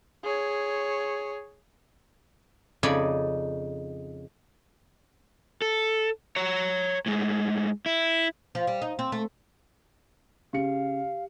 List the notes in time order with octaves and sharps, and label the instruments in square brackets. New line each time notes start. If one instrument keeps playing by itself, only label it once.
[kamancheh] G#4 C#5
[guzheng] F2 C#3 D#4 D5 G#5 B5
[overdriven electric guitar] A4
C#5 A#5
A2 G#3
E4
[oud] F3
G3
D#4
C4
A3
[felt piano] C#3 C#7 [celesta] G4 [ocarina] F5